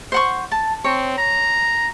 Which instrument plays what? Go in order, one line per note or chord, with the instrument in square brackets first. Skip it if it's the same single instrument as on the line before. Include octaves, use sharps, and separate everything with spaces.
[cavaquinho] C5 F#5 C#6
A5
[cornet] C4 [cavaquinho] C#5
[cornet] A#5